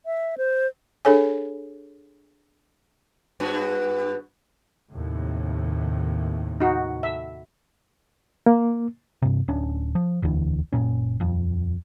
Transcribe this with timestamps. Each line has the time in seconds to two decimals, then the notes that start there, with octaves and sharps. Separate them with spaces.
0.06 E5
0.38 C5
1.05 D4 G#4 A4 C#5 G#5
3.40 G2 B3 F#4
4.93 D#2 A2 C3
6.60 D#4 F#4
7.03 E5
8.46 A#3
9.22 G2 C3
9.48 D1 C#4 D4
9.95 F3
10.22 E1 D2 D3 E3
10.73 F#1 C2 A#2 C#4
11.20 D#1 F2